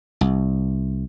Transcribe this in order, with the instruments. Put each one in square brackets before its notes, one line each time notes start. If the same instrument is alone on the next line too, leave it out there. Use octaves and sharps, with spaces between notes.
[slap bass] C2